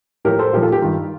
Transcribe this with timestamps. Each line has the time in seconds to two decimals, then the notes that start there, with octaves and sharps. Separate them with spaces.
0.25 A2 F3 G4 A#4
0.39 A4 C5
0.53 A#2 F3 G4 A#4
0.63 F4 A4
0.72 G4
0.82 G2 D#3 F4